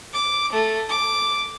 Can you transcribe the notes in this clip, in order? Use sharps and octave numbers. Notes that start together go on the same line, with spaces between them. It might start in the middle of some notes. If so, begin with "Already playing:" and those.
D6
A3
D6